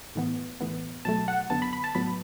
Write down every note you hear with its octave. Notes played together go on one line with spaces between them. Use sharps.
A2 E3 B3
A2 E3 B3
B2 F#3 A3 A5
F#5
F#2 D3 B3 A5
B5
B5
A5
A2 F#3 B3 B5